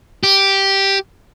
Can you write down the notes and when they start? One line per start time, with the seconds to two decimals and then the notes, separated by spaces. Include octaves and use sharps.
0.23 G4